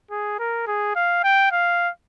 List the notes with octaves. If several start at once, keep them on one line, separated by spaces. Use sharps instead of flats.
G#4
A#4
G#4
F5
G5
F5